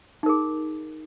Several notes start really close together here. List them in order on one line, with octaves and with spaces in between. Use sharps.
D#4 A#4 G#4